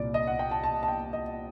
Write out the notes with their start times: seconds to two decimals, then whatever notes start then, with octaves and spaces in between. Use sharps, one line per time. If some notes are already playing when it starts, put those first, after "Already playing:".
Already playing: C2 A#2 D5
0.14 D#5
0.27 F#5
0.39 G5
0.51 A5
0.63 A5
0.83 A5
0.88 G5
1.13 D#5